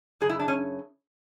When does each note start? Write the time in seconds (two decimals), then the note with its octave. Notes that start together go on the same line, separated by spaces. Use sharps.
0.21 F#2 C#3 G#4
0.29 E4
0.40 D4
0.48 C#4